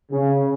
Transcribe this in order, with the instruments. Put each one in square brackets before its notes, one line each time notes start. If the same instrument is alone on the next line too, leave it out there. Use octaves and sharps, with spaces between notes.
[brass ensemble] C#3